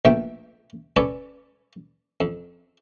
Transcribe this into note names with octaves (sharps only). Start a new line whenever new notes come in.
A#1 B2 A3 E5 G5
C#4 A4 B4 C#5 D5
F2